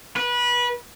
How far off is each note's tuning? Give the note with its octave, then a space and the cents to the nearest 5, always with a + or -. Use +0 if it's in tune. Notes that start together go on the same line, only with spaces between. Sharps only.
B4 -25